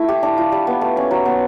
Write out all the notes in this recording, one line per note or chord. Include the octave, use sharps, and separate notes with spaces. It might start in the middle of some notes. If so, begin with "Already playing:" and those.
Already playing: A3 E4
G4
D4
F4
G3
B3
A3
C#4
F#3
B3